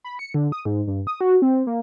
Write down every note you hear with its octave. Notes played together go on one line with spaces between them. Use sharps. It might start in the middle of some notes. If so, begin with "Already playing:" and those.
B5
C#7
D3
D#6
G#2
G2
D#6
F#4
C4
A#3